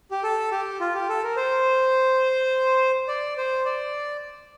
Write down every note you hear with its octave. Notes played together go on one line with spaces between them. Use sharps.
G4
A4
G4
F4
G4
A4
A#4
C5
D5
C5
D5